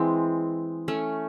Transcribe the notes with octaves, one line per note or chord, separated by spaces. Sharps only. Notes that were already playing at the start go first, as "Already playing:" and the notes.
Already playing: E3 G#3 C4
A3 C#4